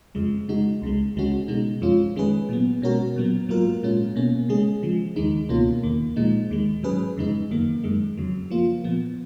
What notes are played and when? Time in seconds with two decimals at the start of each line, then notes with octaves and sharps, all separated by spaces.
0.15 F2 C#3 F3 G#3
0.48 C#3 G#3 D#4 F#4
0.82 C#2 C#3 G#3
1.16 C#2 C#3 G#3 C#4 F#4
1.48 B2 G#3 D#4
1.82 F2 F3 G#3 C#4 F4
2.16 D#3 G#3 C#4 G#4 B4
2.49 A#2 F#3 B3
2.82 B2 G#3 C#4 F#4 A#4
3.16 A#2 F#3 B3
3.49 G#2 F#3 A#3 F4 A#4
3.83 A#2 G#3 C#4 F4
4.16 B2 A#3 C#4
4.49 C#3 G#3 C#4 G#4
4.83 C#3 F3 G#3
5.16 D#2 D#3 G#3 D#4
5.49 C#2 B2 A#3 C#4 F4
5.83 D#2 D#3 A#3
6.16 A#2 F3 G#3 D#4
6.50 D#2 D#3 G#3
6.83 G#2 F#3 C#4 G#4 B4
7.17 F2 C#3 G#3 D#4
7.51 F#2 D#3 A#3
7.83 F#2 D#3 G#3
8.18 F2 C#3 F#3
8.50 F3 A#3 F4
8.84 A#2 F3 B3